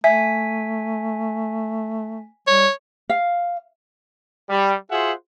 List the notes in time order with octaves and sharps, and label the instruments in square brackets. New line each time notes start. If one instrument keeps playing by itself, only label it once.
[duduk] A3 [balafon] E5 [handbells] G#5 B6
[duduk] G3 [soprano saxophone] C#5
[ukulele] F5
[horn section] G3
F4 F#4 G#4 C5 E5 F#5